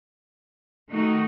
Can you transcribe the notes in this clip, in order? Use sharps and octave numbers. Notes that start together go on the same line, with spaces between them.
D#3 A3 D#4 F#4